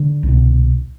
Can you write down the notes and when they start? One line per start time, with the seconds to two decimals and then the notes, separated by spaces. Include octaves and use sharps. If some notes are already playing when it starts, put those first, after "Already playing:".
Already playing: D3
0.23 C2 B2